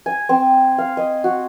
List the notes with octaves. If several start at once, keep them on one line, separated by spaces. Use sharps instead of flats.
G#5
C4
F5
D#5
F#4